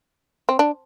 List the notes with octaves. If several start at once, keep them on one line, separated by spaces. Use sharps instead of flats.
C4
D4